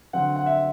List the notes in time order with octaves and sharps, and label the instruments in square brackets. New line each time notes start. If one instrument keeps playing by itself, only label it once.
[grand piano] D3 F#3 C4 F#5
F#5
E5